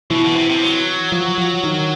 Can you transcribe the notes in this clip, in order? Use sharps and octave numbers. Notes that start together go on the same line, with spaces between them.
B2 E3
B2
C3
C3
F#3
F3
F3
D#3